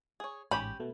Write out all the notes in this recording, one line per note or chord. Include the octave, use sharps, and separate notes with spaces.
G#4 C#5
A1 G#2 C#4 G4 G5 B5
B2 A3 B3